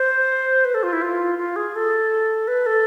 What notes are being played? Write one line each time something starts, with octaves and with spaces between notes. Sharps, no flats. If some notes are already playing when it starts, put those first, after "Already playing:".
Already playing: C5
B4
A4
F4
E4
F4
F4
G#4
A4
B4
A4